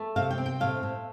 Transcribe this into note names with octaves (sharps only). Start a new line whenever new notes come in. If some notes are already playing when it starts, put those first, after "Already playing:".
Already playing: A3
C3 F5
G5
C4
G5
A2 F5
A2